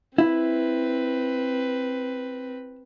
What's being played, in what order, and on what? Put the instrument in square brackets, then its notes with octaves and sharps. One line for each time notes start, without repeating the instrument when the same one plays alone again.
[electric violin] C4 B4 [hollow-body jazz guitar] E4